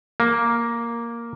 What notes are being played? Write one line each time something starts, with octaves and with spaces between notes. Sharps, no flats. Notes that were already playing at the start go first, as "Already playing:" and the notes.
A#3